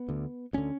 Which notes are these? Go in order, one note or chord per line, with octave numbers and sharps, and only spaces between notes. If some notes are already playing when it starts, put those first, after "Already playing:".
Already playing: B3
D2 D3
D2 D3 C#4